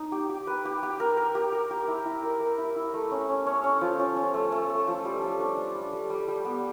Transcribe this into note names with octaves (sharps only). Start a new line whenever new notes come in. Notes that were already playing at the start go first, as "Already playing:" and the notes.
Already playing: D#4
G4
G4
B4
G4
G4
A#4
A#4
G4
A#4
G4
E4
E4
A#4
A#4
E4
E4
A3
C#4
C#4
C#4
C#4
F3
C#4
C#4
A3
A3
A3
F3
G3
G3
D4
D4
G3
G3
G3
G3
B3